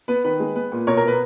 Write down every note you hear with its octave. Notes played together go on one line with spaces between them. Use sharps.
B3 B4
D#3 B4
G#3
B3 B4
A#2
B2 A#4 C#5
A#4
B3 B4